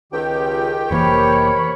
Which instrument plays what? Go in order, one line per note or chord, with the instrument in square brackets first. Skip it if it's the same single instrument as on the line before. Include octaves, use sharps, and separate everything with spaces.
[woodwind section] C#2 [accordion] D#3 G4 G5
[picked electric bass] F1 E3 A#3 [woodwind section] C3 A#4 B5 [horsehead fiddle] C#5